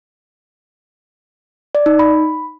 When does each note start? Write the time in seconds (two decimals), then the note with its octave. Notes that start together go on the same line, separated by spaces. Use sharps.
1.75 D5
1.86 D#4
1.99 B5